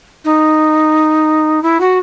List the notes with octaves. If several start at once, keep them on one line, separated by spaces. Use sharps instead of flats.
D#4
E4
F#4